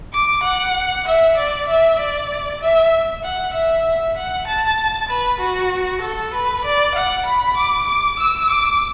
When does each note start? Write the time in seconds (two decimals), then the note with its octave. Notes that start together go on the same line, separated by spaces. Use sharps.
0.13 D6
0.43 F#5
1.06 E5
1.37 D5
1.68 E5
1.99 D5
2.61 E5
3.24 F#5
3.54 E5
4.17 F#5
4.47 A5
5.09 B4
5.40 F#4
6.02 A4
6.34 B4
6.65 D5
6.95 F#5
7.26 B5
7.57 D6
7.88 D6
8.19 E6
8.50 D6